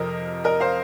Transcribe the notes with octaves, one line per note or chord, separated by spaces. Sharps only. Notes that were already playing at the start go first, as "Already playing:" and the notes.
Already playing: F2 C3 F3 A#4 D#5
A#4 D#5
C5 F5